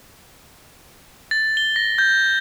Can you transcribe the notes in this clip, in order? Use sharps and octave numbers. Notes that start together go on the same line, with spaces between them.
A6
G7
A#6
G6